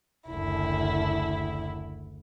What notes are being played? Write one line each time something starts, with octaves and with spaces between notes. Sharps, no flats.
F#1 D2 E4